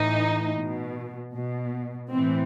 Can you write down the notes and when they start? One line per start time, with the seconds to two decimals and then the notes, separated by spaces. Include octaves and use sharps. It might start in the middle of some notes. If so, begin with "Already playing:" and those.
Already playing: A2 E3 D#4
0.56 B2
1.34 B2
2.11 A2 E3 C4